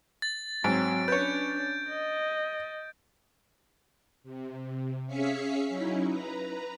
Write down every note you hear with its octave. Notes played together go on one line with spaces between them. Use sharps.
A6
G#2 F#3 C4 D7
C#4 D4 B4 C#5 G6
D#5
C3
C#4 G#4 E5 F5 B6 C#7
F#3 C#4 D#4 E4
B4 A#5